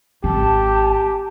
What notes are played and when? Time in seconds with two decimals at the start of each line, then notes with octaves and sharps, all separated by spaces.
0.24 G#1 G4 A5